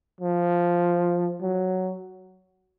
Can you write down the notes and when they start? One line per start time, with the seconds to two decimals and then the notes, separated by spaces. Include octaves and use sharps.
0.20 F3
1.41 F#3